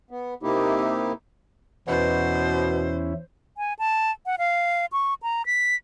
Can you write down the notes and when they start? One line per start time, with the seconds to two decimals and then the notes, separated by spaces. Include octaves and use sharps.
0.11 B3
0.43 C3 A#3 D#4 E4 G4
1.88 E2 B2 C#4 E4 C5
3.58 G#5
3.79 A5
4.26 F#5
4.38 F5
4.92 C#6
5.23 A#5
5.46 B6